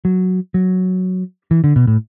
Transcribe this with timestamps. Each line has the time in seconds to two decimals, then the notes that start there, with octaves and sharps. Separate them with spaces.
0.05 F#3
0.54 F#3
1.51 E3
1.64 D3
1.76 B2
1.87 A2